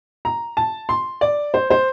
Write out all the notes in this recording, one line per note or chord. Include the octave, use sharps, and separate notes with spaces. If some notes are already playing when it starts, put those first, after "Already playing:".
A#5
A5
C6
D5
C5
C5